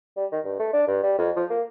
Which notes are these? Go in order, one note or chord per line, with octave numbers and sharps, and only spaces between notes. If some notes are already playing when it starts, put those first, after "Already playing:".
G3
D#3
G2
A3
D4
G2
G3
F2
F3
A#3